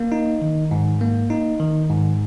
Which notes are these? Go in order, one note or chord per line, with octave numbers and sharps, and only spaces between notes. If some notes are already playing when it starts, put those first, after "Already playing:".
Already playing: A#3
D#4
D#3
G#2
A#3
D#4
D#3
G#2